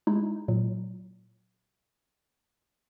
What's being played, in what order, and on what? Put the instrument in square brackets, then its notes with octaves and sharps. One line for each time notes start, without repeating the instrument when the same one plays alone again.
[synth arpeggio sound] G#3 D#4 E4
A#2 F#3